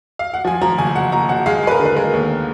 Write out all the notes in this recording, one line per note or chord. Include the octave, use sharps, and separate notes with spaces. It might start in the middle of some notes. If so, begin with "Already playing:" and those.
F5
F#5
F3 G#5
F3 A#5
F#1 G#5
F#1 F#5
F#1 A#5
F#1 F#5
G#3 F5
G#3 B4
A#4
D3
B4
G#3 A#4
D#2